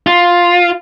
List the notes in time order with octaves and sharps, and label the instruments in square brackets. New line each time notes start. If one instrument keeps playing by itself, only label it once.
[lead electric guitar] F4